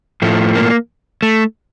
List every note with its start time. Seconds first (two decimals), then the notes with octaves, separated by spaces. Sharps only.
0.22 A2 F3 A3
0.55 A#3
1.23 A3